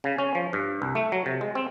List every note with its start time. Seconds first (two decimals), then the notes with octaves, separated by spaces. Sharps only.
0.04 C#3
0.18 C#4
0.35 F3
0.53 G2
0.82 C2
0.95 A3
1.12 F#3
1.26 C3
1.41 G#3
1.55 C4